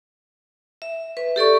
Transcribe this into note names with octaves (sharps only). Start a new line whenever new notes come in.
E5
B4
G4 A4 D5 C#6